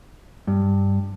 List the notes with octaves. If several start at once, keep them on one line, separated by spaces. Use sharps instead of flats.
G2